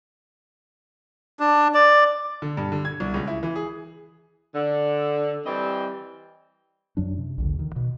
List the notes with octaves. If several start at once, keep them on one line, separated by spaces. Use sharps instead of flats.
D4
D5
D3
G2
D3
G#6
C2
C#2
E4
E3
G#4
D3
E3 G3 C4 G4 D#5
F#2 F#3 D4
C3
A#1 D#2 D3
D2 D#3
B2